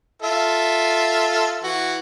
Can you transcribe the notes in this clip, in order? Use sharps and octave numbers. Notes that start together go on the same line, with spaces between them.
F4 A4 E5
E3 F#4